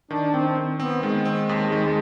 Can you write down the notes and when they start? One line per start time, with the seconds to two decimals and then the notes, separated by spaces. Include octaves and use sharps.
0.10 D#3 D4
0.34 D#3 C4
0.57 D#3
0.80 B3 C4
1.03 D#3 G#3
1.25 C4
1.49 D#2
1.72 D#3